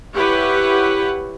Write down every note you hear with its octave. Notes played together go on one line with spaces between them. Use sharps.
E4 G4 B4 C#5 F#5